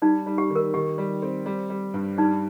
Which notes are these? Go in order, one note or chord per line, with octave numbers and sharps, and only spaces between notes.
G3 D#4
G3
G4
D#3
A#4
D#3 G4
G3
C4
G3
G3
G2
G3 D#4